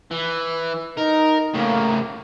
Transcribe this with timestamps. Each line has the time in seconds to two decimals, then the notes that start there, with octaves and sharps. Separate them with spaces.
0.11 E3
0.97 D#4 A#4
1.54 A2 C#3 A#3